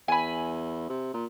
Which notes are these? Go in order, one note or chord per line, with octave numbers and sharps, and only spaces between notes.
E2 G#5 B5
C3
A#2